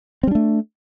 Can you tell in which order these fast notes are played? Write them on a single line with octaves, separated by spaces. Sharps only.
C4 G3 D4 A3